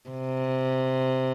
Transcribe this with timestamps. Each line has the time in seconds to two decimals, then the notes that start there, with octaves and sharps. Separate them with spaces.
0.10 C3